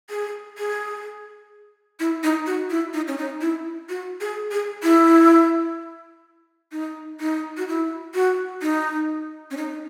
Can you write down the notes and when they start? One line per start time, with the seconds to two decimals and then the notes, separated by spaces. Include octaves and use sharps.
0.10 G#4
0.58 G#4
2.00 E4
2.24 D#4
2.46 F#4
2.70 E4
2.94 D#4
3.08 C#4
3.18 D#4
3.41 E4
3.89 F#4
4.21 G#4
4.52 G#4
4.83 E4
6.72 D#4
7.20 D#4
7.58 F#4
7.68 E4
8.14 F#4
8.62 D#4
9.51 C#4
9.57 D#4